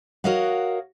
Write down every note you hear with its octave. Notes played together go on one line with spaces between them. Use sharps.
F#4 A#4 C#5 D#5 F5 F#5